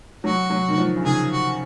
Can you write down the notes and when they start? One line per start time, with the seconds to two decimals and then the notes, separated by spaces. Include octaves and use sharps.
0.24 F#3 F#4
0.50 F#3
0.68 D#3
0.78 F3
0.96 C#3
1.04 D#3 G#4
1.31 F#4